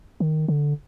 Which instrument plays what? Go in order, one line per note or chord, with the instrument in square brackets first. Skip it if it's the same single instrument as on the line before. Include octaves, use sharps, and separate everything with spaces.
[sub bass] D#3
D3